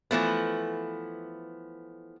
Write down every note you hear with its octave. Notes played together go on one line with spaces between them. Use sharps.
E3 F3 A3 B3